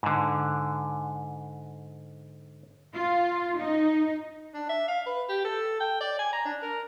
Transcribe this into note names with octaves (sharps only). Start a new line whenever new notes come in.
G#2 D3
F4
D#4
D4
E5
F5
B4
G4
A4
G5
D5
G#5
A#5
D4
A#4